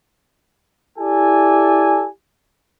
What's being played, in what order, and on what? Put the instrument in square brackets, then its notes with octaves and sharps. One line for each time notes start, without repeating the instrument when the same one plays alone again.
[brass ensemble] E4 G4 A4 D5 G#5